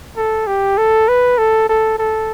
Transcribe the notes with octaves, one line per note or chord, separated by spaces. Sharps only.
A4
G4
A4
B4
A4
A4
A4